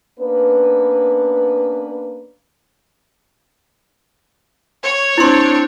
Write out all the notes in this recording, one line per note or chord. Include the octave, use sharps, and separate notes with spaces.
A#3 B3 C#4 D4 B4
C#5
C4 D4 E4 C6